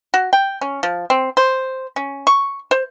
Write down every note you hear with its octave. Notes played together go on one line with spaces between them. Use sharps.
F#4
G5
C#4
F3
C4
C5
C#4
C#6
C5